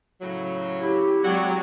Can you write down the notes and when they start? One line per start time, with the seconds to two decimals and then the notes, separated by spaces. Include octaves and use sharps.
0.21 A2 C#3 F#3
0.81 E4 G4
1.24 F#3 G#3 C4 F#4 D5